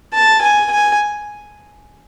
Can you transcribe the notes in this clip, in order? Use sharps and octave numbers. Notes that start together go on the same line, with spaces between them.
A5
G#5
G#5